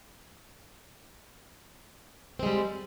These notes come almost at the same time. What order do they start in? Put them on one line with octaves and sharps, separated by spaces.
C4 G#3 G3